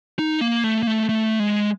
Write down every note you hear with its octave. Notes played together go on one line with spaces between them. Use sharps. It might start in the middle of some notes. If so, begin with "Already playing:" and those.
D#4
A#3
A3
A#3
A3
A3
G#3